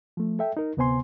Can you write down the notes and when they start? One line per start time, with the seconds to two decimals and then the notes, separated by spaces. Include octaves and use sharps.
0.17 F3 A3
0.39 A4 E5 G5
0.57 D#4 A#4
0.77 D2 C3 B3 C5 G#5 C6